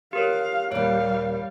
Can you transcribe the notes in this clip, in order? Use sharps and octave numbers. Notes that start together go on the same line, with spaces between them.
G4 A#4 C#5 F5
D#2 A#2 G3 C#5 F5